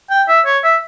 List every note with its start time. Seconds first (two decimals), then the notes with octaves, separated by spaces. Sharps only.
0.10 G5
0.28 E5
0.46 C#5
0.64 E5